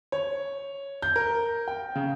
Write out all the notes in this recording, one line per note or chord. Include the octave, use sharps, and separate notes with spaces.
C#5
G6
A#4
G5
C#3